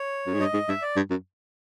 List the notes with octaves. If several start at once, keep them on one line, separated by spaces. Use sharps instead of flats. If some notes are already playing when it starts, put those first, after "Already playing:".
Already playing: C#5
F#2
G#2
G2 D#5
G#2
G2 E5
D5
G2
F#2